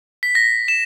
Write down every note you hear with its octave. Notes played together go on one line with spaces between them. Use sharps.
B6
A#6
E7